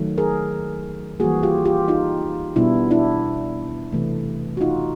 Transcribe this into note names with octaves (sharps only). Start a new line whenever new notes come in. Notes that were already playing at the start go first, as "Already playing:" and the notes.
Already playing: D#3 F#3 A3
G#4 A#4
E3 G3 A#3 F#4 G#4
F4 G4
F4 G4
D#4 F4
B2 G3 B3 D4 E4
D4 E4
C3 E3 A3
F#4
D#4 F4